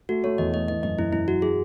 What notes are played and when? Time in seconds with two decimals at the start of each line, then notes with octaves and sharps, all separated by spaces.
0.09 A3 F#4
0.24 A3 C#5
0.38 E2 D#5
0.54 A3 D#5
0.68 E3 D#5
0.83 F#2 D#5
0.98 F#2 E4
1.13 F#2 E4
1.27 F#3 F#4
1.42 F#3 G#4